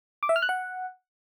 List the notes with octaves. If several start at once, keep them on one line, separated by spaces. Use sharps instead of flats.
D6
E5
F6
F#6
F#5